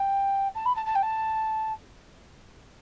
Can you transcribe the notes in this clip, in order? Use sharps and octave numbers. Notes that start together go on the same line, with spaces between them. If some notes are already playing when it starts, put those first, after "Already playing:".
Already playing: G5
A5
B5
A5
A5
G5
A5